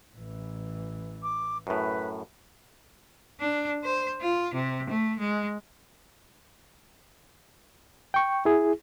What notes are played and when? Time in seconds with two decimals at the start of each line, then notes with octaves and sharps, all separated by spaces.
0.17 A1 E3
1.23 D6
1.67 F#2 A2 B4
3.40 D4
3.83 C5
4.22 F4
4.54 C3
4.89 A3
5.19 G#3
8.14 G5 C#6
8.45 E4 G#4